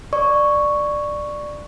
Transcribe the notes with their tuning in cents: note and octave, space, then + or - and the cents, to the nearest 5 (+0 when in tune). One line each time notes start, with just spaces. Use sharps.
D5 +10 C#6 +0